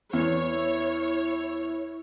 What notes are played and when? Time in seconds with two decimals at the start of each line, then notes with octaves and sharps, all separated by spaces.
0.13 E2 E4 C#5